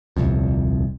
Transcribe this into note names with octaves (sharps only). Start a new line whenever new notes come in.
D#1 C2 F2